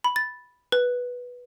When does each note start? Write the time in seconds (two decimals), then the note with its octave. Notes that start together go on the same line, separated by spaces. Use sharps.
0.04 B5
0.16 A6
0.72 B4